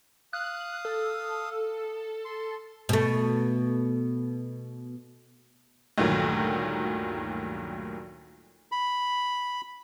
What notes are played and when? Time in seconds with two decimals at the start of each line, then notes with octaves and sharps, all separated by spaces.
0.33 F5 D#6 F#6
0.85 A4
2.25 C6
2.89 B2 A3
5.98 D2 G2 A#2 D#3 F#3
8.72 B5